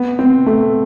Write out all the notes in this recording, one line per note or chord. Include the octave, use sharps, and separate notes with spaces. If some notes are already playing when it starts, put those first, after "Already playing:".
Already playing: B3
C4
A3